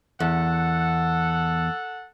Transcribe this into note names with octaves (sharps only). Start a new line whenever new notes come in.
E2 A4 F#5